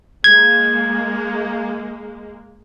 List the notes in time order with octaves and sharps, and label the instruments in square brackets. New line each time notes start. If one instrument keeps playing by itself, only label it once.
[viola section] G#3 A#3 [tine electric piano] G#6